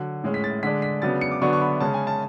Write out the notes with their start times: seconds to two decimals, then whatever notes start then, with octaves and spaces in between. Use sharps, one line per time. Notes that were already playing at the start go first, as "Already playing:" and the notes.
Already playing: D3 F#3
0.24 A2 G#3 C#4
0.34 B6
0.44 A6
0.63 D3 G#3 D4 B6
0.82 B6
1.02 C#3 F#3 B3 D4 A6
1.21 C#7
1.31 D6
1.42 D3 F#3 B3 D4 C#6
1.53 C#6
1.61 B5
1.80 C#3 G#3 C#4 A5
1.94 G#5
2.07 A5